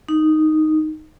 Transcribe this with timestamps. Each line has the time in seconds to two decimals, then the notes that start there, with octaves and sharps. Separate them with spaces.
0.09 D#4